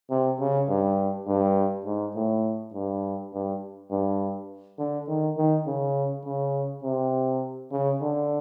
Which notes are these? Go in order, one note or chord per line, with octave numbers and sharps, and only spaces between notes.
C3
C#3
G2
G2
G#2
A2
G2
G2
G2
D3
D#3
D#3
C#3
C#3
C3
C#3
D3